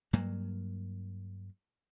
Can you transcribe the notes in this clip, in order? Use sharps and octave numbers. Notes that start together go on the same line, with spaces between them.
G2 F#3 A#3